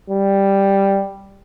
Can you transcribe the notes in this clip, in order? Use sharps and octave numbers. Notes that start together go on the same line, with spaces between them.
G3